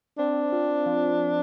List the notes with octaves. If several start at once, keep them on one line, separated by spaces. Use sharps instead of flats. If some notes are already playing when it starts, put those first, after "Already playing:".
C4 D4
F4
F3